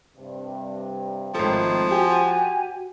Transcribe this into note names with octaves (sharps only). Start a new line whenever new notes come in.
G2 C3
G#1 D#3 F3 A3 A4
F#4 G4 G#5